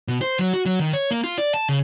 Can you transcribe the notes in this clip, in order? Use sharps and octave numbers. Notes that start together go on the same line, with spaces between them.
B2
C5
F#3
F#4
F#3
D#3
C#5
A#3
F4
D5
A5
C#3